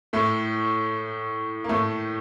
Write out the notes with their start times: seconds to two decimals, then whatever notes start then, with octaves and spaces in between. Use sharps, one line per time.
0.13 A2 A3
1.64 A#3
1.69 A2 A3